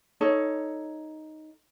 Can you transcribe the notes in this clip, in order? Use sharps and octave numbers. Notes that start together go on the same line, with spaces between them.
D#4 A4 C#5